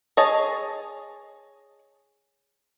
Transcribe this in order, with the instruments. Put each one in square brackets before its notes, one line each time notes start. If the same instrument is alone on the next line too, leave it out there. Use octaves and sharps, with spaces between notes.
[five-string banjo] G#4 C#5 D#5 A5